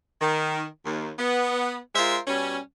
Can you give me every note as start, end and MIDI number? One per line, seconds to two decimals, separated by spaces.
0.20 0.63 51
0.84 1.09 39
1.18 1.76 59
1.95 2.17 56
1.95 2.17 65
1.95 2.17 70
1.95 2.17 72
1.95 2.17 76
2.26 2.57 47
2.26 2.57 55
2.26 2.57 61